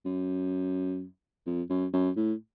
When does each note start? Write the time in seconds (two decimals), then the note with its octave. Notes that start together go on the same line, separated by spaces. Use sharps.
0.05 F#2
1.46 F2
1.69 F#2
1.93 F#2
2.16 A2